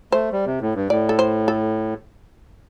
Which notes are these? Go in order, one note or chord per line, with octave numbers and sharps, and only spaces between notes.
A3 C5
G3
C3
A2
G2
A2 D5
A4
C5
A4